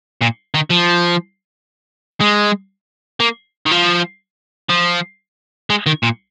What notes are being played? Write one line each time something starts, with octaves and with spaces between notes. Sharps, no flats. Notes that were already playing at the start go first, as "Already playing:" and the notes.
A#2
D#3
F3
G#3
A#3
D#3
F3
F3
G#3
D#3
A#2